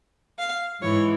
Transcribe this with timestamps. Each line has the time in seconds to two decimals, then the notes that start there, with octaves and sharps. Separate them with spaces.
0.38 F5
0.82 G#2 E3 C#5